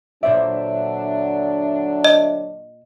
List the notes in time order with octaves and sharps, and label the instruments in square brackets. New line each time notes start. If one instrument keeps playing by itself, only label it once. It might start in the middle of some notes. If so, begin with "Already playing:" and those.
[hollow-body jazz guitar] A#2 C5 D5 [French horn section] D3 F#3 D4 [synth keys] E5
[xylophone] D#5